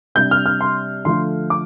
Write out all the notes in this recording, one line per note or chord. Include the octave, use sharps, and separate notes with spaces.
C3 G3 D4 G6
F6
F6
C6
D3 F3 A3 F4 C6
D6